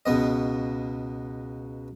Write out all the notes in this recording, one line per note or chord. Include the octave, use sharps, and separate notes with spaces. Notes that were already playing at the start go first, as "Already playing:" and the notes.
C#2 B2 B3 D#5